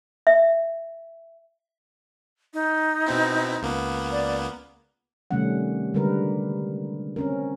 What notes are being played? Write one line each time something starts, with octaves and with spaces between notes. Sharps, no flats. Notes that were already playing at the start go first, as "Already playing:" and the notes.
E5
D#4
B2 C4 E4
C#2 A#3 B3
D5
C3 D#3 G3 A3 C#4 F#5
D3 G3 G#3 A#4 B4
C4 C#4 A#4